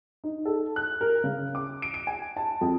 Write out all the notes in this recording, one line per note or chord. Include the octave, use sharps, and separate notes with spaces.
D#4
A4
F#6
A#4
C#3
D6
D7
D7
G#5
A5
F2